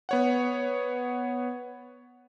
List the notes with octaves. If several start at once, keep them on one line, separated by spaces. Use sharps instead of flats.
B3 C#5 F#5